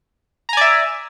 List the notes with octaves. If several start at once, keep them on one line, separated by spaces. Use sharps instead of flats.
D5 E5 G#5 A#5